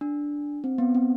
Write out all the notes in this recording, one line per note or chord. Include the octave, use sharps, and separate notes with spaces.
D4
C4
B3
C4